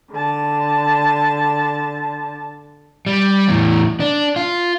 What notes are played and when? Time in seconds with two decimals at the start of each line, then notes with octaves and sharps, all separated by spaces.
0.12 D3 A5
3.06 G3
3.48 E2 A2
4.00 D4
4.36 F4